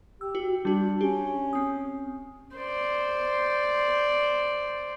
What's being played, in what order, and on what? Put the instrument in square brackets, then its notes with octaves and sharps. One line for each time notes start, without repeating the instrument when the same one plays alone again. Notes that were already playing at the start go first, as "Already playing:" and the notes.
[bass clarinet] G4 [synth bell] E6
[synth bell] F#4
[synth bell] G3 F#4 [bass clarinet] D4
[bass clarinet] C#4 [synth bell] G4
[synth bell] C4 D#6
[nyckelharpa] C5 D5